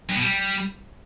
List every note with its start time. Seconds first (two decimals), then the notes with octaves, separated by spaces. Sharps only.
0.09 G2
0.15 B2
0.21 G3